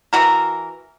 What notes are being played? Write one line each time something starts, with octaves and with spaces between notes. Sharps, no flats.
E3 F#4 A#4